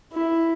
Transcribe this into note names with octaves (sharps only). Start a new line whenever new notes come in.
E4